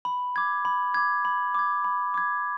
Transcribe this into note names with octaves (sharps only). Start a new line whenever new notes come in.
B5
D6 G#6
B5
D6 G#6
B5
D6 G#6
B5
D6 G#6